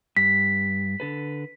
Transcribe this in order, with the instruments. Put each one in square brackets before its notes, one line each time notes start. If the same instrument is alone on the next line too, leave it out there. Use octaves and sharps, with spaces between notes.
[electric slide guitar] G2 [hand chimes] B6
[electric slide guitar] D3 A4 B4